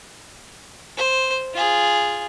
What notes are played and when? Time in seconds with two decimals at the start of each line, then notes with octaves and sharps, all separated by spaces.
0.97 C5
1.54 F4 G#4